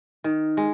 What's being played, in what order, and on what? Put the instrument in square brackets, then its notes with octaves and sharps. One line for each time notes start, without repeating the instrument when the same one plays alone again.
[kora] D#3
G#3